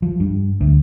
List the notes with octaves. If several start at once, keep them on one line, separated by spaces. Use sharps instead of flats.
F3
G2
D2